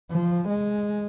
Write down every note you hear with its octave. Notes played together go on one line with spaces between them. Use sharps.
F3
G#3